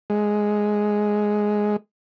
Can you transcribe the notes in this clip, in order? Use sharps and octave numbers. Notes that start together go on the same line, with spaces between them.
G#3